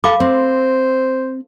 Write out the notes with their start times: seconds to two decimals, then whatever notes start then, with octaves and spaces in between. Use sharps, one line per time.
0.04 A4 F5 B5 D6
0.20 C4 C5